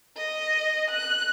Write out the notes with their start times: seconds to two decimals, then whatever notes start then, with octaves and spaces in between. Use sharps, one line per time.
0.17 D#5
0.90 F#6